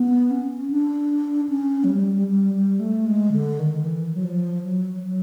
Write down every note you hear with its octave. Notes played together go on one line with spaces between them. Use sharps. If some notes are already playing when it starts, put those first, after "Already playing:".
Already playing: B3
C#4
D4
C#4
F#3
G3
G3
G3
A3
G#3
D3
D#3
E3
F#3
F3
F#3
F#3